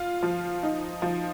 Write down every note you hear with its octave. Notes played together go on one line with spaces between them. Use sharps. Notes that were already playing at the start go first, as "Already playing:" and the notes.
Already playing: F4
F3
D#4
F3